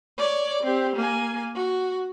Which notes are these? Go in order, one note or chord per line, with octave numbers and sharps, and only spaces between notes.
C#5 D5
C4 G4
A#3 G#5
F#4